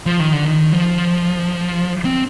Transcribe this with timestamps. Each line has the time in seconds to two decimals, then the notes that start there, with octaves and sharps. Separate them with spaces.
0.06 F3
0.20 D#3
0.33 D3
0.46 D#3
0.72 F3
2.05 C4